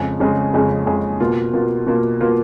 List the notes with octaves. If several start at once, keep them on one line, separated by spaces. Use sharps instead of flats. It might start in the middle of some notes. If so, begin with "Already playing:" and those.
Already playing: F2 C#3 G#3 C#4 G#4
F2 C#3 G#3 C#4 G#4
F2 C#3 G#3 C#4 G#4
F2 C#3 G#3 C#4 G#4
B2 A#3 F4
B2 A#3 F4
B2 A#3 F4
B2 A#3 F4